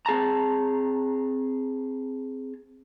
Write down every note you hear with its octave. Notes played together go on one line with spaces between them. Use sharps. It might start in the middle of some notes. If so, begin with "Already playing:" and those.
C4 G#4 A5 A#5